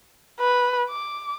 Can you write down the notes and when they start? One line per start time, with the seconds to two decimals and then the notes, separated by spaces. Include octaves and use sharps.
0.40 B4
0.89 D6